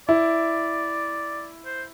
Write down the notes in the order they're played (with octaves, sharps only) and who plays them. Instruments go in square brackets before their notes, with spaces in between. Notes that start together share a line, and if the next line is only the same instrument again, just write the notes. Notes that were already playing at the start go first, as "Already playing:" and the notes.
[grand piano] E4 [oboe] D5
[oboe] C5